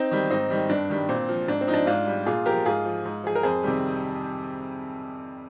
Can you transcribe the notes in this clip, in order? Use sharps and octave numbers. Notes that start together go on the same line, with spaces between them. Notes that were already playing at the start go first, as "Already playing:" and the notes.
Already playing: C4 D#4
D#3 G3
G#2 C4 D#4
D#3 G3
G2 D4
D#3 G3
A#2 C4
F3
G#2 D4
C4
F3 D#4
D4
G#2 D4 F4
G3
A#2 F4 G#4
F3 G4 A#4
G#2 F4 G#4
F3
G#2
F3 G#4
A#4
F2 G#4 C5
C3 D#3 G3